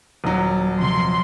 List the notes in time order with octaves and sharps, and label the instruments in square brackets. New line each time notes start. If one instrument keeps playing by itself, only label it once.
[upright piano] D#1 F#3
[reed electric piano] C3 F3 [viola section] C6